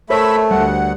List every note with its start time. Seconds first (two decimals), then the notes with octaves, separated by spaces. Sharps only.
0.10 A3 A#4 C5 C#5 E5 B5
0.51 D2 G3 F#5